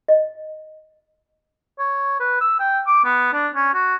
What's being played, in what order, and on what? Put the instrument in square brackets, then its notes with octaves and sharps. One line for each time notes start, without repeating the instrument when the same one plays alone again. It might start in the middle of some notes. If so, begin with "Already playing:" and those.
[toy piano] D#5
[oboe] C#5
B4
E6
G5
D6
B3
D4
C#4
F#4